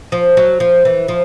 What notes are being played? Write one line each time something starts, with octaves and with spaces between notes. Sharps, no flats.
F3
F#3
F3
E3
F3